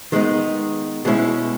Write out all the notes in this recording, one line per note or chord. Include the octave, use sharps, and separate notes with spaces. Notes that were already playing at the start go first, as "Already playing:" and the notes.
D#3 G#3 B3 D#4
B2 G#3 C#4 E4